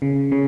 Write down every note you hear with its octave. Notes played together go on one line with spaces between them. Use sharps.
C#3
C#3